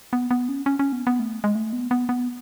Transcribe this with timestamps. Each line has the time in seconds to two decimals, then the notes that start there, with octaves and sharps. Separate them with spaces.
0.13 B3
0.31 B3
0.49 C#4
0.66 C#4
0.79 C#4
0.92 B3
1.07 B3
1.20 A3
1.44 G#3
1.55 A3
1.73 B3
1.91 B3
2.09 B3